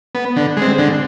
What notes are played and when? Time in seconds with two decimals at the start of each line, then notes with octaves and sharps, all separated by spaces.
0.15 B3
0.36 D3
0.57 G#3 C4
0.78 D3